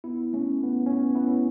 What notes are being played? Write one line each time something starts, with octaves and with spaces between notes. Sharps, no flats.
B3 E4
A3 C#4
B3
C#4
B3
B3 E4
C#4